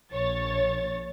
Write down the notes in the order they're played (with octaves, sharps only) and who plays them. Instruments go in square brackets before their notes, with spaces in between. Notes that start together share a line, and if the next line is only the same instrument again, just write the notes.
[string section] A#1 C#5 A6